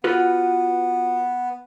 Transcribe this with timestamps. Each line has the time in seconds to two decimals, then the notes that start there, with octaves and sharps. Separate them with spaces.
0.04 B3 F4 F#4 B4